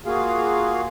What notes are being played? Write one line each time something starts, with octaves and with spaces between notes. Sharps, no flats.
A#3 F4 F#4 G#4 F5